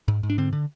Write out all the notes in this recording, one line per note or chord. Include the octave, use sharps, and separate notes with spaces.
G#2
G#2
D4
D3 C4
D3